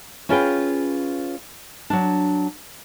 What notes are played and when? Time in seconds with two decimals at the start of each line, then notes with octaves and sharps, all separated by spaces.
0.29 C#4 E4 F4 G#4 B4 G5
1.90 F#3 D4